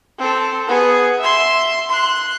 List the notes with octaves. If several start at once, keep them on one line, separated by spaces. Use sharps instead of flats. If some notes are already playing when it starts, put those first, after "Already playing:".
C4 A4
B3 G#4
E5 C6
C6 F#6